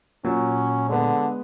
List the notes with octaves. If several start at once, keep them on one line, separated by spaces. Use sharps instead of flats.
A#2 F#3 C#4
D3 G#3 B3